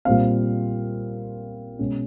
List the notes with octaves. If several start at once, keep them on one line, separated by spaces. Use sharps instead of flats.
A#2 G3 C4 F5
B2 G#3 C#4